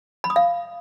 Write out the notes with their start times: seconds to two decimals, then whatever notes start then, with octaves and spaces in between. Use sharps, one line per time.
0.24 B5
0.30 D#6
0.36 F5